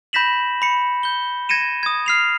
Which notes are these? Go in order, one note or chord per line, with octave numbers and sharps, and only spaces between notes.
B5 G6 A#6 B6 E7 F#7
B5 C#7
G6 G7
G#6 A#6 C#7 D#7 E7
D#6 G#6
F6 C7 F7